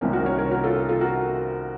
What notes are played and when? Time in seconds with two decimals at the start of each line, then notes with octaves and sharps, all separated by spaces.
0.01 C2 C3 D#3 A#3 C#4
0.13 F#4 A#4
0.26 A#4 C#5
0.38 A#4 C#5
0.51 F#4 A#4
0.64 F4 A4
0.76 F4
0.89 F4 A4
1.01 F#4 A#4